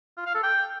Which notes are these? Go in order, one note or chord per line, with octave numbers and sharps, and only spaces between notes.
F4
F5
A4
G5